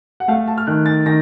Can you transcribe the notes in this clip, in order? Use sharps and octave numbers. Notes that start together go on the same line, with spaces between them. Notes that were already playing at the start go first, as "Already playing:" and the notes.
F#5
A3 F5
A5
F6
D#3 F#6
A6
D#3 A#6